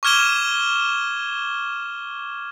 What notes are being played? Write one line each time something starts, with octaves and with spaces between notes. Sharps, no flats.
C#6 D6 F6 G#6 E7 G7